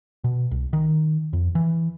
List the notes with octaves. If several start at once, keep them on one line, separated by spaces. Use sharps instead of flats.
B2
C2
D#3
F2
E3